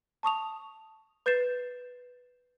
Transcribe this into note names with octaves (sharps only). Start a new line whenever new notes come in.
A5 C#6 D#6 F7
B4 G6 A6 C7 E7